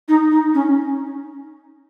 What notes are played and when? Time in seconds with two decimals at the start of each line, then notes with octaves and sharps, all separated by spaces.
0.08 D#4
0.31 D#4
0.54 C#4